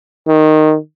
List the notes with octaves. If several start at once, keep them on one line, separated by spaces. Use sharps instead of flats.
D#3